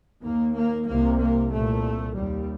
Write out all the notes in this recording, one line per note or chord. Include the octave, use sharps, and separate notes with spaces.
D#2 A#3
A#3
C2 C3 A#3
A#3
C2 A#2 A3
D#2 G3